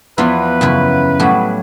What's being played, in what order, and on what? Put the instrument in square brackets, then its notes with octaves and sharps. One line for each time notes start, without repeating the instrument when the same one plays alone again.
[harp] E2 F3 B3 [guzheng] E4 F4 [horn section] B4
[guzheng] F#2 C#3 E4
[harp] A2 F#3 [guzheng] G3 F#4